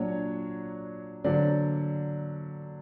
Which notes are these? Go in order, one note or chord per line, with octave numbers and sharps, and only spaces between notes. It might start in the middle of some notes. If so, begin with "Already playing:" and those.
Already playing: A#2 F#3 A#3 D4 C#5
D3 F#3 A#3 D4 C5 D5